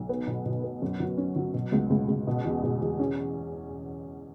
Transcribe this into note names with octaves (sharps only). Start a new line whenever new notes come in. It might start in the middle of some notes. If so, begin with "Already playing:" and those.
Already playing: B1
B3
B2
B2
B3
F#2
F#3
C#4
F#3
B2
C#2
C#2
C#2
B2
E2
B2
E2
C#4